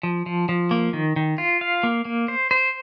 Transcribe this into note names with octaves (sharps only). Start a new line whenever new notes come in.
F3
F3
F3
A#3
D#3
D#3
F4
F5
A#3
A#3
C5
C5